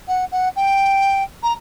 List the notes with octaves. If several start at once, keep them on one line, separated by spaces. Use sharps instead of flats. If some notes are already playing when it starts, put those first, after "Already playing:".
F#5
F#5
G5
A#5